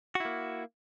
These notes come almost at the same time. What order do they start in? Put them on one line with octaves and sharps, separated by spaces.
F#4 E4 A#3